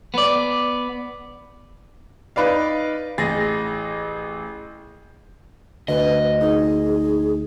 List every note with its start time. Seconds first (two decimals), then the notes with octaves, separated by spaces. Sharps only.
0.14 B3 D5
2.36 D#4 B4 D5 F5
3.18 A1 G#4 A6 A#6
5.88 D2 B4 D#5
6.41 D#4 G#4